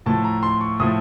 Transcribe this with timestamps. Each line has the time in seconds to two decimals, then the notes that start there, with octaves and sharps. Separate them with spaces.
0.06 A2 F3 A3 A5
0.24 A#5
0.43 C6
0.61 C#6
0.80 A2 F3 A3 D#6